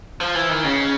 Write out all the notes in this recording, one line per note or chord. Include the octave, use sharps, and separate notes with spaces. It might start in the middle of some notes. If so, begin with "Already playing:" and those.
F3
E3
D#3
C#3